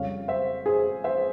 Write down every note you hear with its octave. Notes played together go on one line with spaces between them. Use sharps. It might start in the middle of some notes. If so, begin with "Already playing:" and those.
Already playing: F2 C#3 G3 C#5 F5
C5 E5
G#4 C5
C5 E5